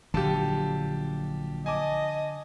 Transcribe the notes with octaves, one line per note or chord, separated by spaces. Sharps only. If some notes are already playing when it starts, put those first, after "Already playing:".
A#1 D3 F#3 G4 F5 A5
D#5 G#5 A5 D6